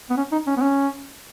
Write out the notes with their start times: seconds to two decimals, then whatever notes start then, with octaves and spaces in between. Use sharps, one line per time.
0.10 B3
0.17 C#4
0.32 D#4
0.47 C#4
0.57 B3
0.61 C#4